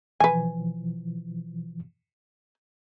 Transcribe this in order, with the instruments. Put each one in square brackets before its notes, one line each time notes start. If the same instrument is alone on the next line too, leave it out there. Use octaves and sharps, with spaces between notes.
[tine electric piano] B2 E3 F3 [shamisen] B4 G#5